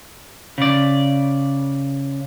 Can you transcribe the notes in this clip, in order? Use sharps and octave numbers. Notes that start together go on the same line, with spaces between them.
C#3 D5